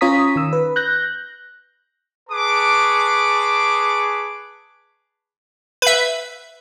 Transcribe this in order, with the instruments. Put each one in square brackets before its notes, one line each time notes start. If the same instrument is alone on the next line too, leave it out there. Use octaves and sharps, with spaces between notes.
[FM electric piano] C#4 F4 C#5 A#5 D#6 B6
D#3 E6
B4
F#6 G6 A#6
[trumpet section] G#4 B4 A5 C#6 D6
[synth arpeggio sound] B4 E5